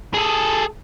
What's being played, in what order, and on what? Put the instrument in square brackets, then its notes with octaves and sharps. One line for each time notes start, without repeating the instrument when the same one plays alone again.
[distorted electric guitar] G#4 A4